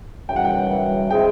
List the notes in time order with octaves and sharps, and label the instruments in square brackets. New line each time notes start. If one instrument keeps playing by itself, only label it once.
[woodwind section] F#2 C#3 E3 G3 [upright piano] G5
[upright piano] F#5
G5
[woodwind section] F#2 C#3 E3 G3
[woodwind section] G#3 C4 E4 G#4 [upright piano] G5